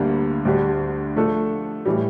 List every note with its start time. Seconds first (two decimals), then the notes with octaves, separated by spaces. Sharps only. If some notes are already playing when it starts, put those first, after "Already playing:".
Already playing: D2 D3 G3 A#3
0.45 D2 D3 G3 D4 G4
1.16 F3 A3 D4 A4
1.86 A2 E3 G3